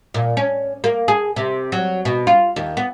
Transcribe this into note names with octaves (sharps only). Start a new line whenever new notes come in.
A#2
C#4
A#3
G#4
C3
F#3
B2
F4
D#2
B3